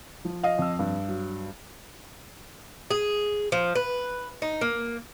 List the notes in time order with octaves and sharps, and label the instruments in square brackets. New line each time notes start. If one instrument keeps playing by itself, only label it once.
[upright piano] F3
[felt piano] D#5 F5
[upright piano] F2 E6
[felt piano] G2
[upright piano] F#3
[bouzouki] G#4
F3
B4
D#4
A#3